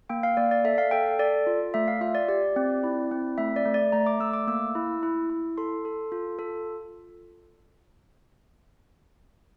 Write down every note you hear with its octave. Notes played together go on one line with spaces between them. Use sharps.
A#3 G5
F5
A#3 D5
D5
A4 E5
F5
A4 G5
A4 D5
F4
A3 E5
F5
F4 E5
D5
G4 D5
C4
E4
C4
A3 E5
D5
A3
D5
A3 A#5
D6
A3 E6
D6
A#3 E6
E4
E4
E4
A4 C6
A4
F4
A4